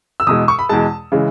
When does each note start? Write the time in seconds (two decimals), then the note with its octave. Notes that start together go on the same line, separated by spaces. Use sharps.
0.20 E6
0.27 E2 B2 G#3 D#6
0.48 C#6
0.59 B5
0.69 E2 B2 G#3 A5
1.12 C#3 E3 G#3